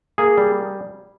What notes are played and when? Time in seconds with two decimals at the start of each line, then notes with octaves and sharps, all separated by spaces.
0.18 A#3 G#4
0.38 G3